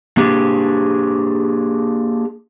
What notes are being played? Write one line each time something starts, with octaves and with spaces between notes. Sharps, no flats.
A#3 D4 G4 G#4